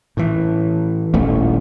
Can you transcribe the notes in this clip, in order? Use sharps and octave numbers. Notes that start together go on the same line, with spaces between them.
A2 E3
D#1 A1 A3